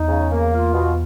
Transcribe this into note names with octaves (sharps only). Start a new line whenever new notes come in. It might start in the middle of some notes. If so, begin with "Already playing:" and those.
Already playing: E2 D#4
C#3
A#3
F4
B2